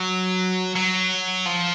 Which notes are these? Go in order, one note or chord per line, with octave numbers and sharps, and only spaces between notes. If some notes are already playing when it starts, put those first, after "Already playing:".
Already playing: F#3
F#3
F3